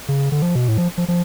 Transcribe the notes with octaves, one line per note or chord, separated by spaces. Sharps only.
C#3
D3
F3
B2
A2
F3
F3
F3